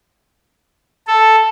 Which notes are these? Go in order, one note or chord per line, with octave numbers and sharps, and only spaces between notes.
A4